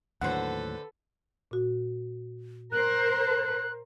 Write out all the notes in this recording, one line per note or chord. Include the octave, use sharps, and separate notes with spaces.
D#2 A2 D3 F#3 A4 B4 C5 F#5
A#2 F#4
A#4 C5 F#6